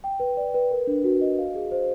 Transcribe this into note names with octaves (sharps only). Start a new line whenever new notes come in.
G5
B4
D5
B4
A#4
D4
F#4
D#5
F5
G#4
C5